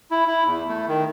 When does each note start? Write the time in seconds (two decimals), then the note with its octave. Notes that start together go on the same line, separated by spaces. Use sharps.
0.11 E4
0.27 E4
0.46 E2
0.69 A3
0.88 D#3